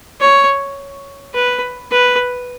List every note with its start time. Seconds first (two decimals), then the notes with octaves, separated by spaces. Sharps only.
0.20 C#5
1.34 B4
1.91 B4